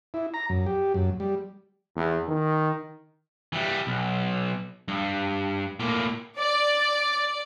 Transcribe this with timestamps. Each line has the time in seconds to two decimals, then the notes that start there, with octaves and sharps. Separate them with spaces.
0.14 E4
0.34 A#5
0.49 F#2
0.66 G4
0.94 F#2
1.20 G3
1.96 E2
2.28 D#3
3.53 E3 G3
3.87 B1
4.88 G2
5.80 A2 A#3
6.39 D5